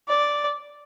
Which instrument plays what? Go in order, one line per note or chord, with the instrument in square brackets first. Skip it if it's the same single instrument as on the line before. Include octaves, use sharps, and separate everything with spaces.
[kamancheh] D5